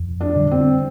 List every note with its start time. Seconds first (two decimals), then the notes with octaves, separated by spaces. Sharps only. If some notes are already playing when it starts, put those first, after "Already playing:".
Already playing: F2
0.21 D4
0.36 D3 G3
0.51 C4